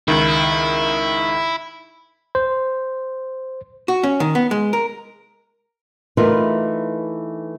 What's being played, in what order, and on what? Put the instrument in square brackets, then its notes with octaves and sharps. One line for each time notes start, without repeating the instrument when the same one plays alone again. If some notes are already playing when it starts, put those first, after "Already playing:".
[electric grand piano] C#2 D#3 [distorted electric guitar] E4
[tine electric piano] C5
[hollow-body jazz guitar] F#4
C#4
D#3
B3
G#3
A#4
[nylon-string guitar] E3 A3 D#4 F4 A#4 B4